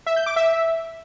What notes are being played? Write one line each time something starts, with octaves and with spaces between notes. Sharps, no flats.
E5
G6
D6
E5